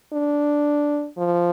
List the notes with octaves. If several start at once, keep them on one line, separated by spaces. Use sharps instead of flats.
D4
F3